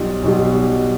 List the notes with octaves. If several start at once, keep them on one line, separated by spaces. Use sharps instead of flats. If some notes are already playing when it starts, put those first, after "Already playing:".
Already playing: B1 B2 G3 F4
B1 B2 G3